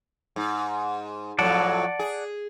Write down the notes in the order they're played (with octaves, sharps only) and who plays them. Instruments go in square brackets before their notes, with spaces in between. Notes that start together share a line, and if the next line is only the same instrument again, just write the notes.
[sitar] G#2
[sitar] F2 A2 F#3 [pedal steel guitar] D5 F#5 A5
[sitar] G#4